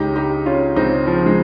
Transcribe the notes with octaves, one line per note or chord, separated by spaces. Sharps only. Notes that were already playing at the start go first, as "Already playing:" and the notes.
Already playing: C#2 C#3 D#4 G4
D#4 G4
C#4 F4
C#2 C#3 C4 D#4
F3
G#3